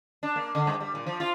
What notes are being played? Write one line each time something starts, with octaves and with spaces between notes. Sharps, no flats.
D4
A#3
D3
G2
G3
A#2
F3
F4